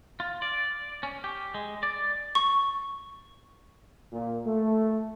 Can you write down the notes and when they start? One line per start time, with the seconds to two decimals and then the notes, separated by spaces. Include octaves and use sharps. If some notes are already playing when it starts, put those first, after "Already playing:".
0.20 F4
0.42 D5
1.03 C#4
1.24 G4
1.54 G#3
1.83 D5
2.35 C#6
4.12 A#2
4.45 A3